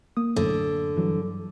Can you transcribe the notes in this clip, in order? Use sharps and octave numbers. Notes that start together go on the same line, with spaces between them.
A#3 D#6
B1 F#2 A2 D3
G2 E3 F#3